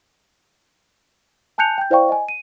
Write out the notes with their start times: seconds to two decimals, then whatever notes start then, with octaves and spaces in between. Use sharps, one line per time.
1.58 G#5 A5 F#6 G6 C#7 F7
1.78 G5 G6
1.90 E4 C5 D5 F5 G5 C#6
2.09 D#5 G#5
2.29 D#7